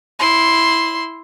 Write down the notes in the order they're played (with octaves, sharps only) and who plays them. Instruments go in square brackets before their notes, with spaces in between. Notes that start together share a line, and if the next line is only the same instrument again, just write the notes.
[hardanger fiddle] E4 C6